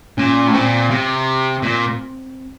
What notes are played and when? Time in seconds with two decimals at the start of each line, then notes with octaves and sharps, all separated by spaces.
0.18 A#2 C#4
0.47 A2
0.54 A#2 C4
0.90 C3
1.62 A#2